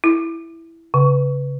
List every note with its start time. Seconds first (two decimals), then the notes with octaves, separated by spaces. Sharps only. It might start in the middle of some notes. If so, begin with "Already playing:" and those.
0.04 E4
0.94 C#3